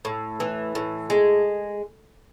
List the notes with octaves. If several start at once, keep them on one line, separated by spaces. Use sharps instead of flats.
A2
E3
A2
G#3